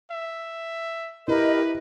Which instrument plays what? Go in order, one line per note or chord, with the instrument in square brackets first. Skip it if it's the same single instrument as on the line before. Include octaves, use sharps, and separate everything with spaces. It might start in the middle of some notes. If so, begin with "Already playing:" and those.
[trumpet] E5
[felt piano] E4 [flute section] G4 A#4 D#5 [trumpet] B4